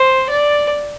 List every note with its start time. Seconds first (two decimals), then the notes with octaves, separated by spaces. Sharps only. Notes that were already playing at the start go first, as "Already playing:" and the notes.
Already playing: C5
0.30 D5